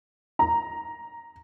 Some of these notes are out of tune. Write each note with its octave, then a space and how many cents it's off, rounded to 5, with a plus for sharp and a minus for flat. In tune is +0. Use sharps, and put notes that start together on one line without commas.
A#5 +0